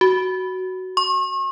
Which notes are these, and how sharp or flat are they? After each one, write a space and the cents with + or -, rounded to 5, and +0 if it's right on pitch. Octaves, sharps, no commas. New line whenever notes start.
F#4 +10
C#6 -40